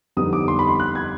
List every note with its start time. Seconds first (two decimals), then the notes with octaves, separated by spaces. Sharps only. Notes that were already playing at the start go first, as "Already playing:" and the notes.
0.17 F2 D3 G3 B3 D#4 D#6
0.33 D6
0.48 C6
0.59 B5
0.69 C6
0.80 F#6
0.95 G#6